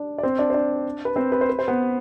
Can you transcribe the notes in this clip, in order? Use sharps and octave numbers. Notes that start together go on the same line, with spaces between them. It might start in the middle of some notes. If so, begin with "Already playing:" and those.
Already playing: D4 D5
D5
C4 C5
D4 D5
C5
D4 D5
B4
C4 C5
B4
C5
B4
C5
B3 B4